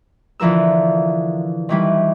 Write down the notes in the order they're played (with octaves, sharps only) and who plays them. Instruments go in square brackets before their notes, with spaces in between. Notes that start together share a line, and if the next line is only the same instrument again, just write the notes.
[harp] D3 E3 F3 A#4 E6
D#3 E3 G3